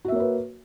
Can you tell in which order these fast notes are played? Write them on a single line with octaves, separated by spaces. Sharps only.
F#4 E5 A#3 C#5 B4